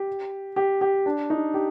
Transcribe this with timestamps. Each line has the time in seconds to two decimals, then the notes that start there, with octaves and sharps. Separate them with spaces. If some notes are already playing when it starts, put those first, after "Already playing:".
Already playing: G4
0.56 G4
0.81 G4
1.06 D4
1.30 D#4
1.54 G4